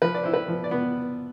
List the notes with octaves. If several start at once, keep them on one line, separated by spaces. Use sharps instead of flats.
F3 B4
D5
E4 C5
B4
F3
D5
B3